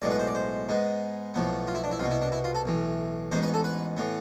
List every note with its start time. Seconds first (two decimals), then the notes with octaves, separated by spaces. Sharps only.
0.02 B1 A2 G#3 B3 D5
0.11 B4
0.19 C5
0.27 D5
0.35 C5
0.69 G#2 G#3 B3
1.34 B1 A2 F3 B3
1.67 F4
1.75 E4
1.84 D4
1.91 E4
1.99 C2 B2 B3 F4
2.11 E4
2.22 D4
2.32 E4
2.44 F4
2.55 A4
2.65 B1 A2 E3
3.31 A1 G#2 G#3 B3 C5
3.43 B4
3.54 A4
3.64 B4
3.97 A2 E3 B3